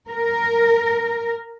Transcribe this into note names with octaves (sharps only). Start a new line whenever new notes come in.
A#4